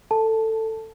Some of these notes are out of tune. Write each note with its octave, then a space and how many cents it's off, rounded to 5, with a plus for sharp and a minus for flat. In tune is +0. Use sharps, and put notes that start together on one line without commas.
A4 +15 A5 +0